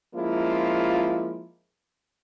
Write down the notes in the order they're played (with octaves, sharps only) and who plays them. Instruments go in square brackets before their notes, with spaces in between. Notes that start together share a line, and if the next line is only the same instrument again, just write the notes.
[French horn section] F3 G#3 A#3 C#4 E4 F4